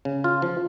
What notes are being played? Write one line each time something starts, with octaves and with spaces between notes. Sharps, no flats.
C#3
F4
F3